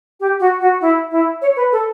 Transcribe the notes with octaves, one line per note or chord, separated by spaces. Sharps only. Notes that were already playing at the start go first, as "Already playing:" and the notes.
G4
F#4
F#4
E4
E4
C#5
B4
A4